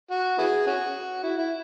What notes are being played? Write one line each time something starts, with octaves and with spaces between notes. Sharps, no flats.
F#4
B3 E4 G#4
C#4 F#4
E4
E4